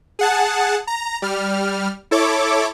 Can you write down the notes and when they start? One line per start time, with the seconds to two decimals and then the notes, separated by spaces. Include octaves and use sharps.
0.19 G#4 F#5 A5
0.87 A#5
1.22 G3 F6
2.11 E4 A4 C#5 D6